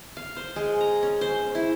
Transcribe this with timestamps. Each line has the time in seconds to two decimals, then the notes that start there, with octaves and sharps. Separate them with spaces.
0.17 F5
0.37 C5
0.56 G#3
0.81 A#5
1.03 C#4
1.21 C5
1.55 E4